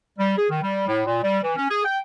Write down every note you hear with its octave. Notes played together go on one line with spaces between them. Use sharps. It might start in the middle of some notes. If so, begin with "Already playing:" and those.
G3
G#4
D#3
G3
A2
A#2
G3
E3
C#4
G#4
G5